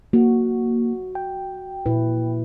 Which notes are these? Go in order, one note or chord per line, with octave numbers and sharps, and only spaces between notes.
A#3 F#4
G5
A#2 E4 B4